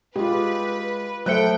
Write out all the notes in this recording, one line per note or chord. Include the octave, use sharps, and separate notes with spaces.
G#3 F4 G4 B4
F#3 A3 A4 C5 E5 G5 F#6 C#7